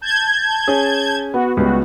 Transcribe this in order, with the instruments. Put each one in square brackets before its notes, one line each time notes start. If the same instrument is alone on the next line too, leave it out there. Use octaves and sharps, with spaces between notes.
[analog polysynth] A5 G6 G#6
[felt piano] C#4 G#4
[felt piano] B3 [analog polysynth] F#4
[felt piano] C#2 B3 [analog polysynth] G3 F#4